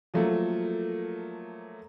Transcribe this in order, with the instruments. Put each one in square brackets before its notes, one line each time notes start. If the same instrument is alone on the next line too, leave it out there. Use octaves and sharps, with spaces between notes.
[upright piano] F3 F#3 A3 A#3 A4